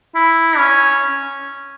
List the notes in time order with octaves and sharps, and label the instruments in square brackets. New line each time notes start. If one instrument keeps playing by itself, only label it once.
[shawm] E4
C#4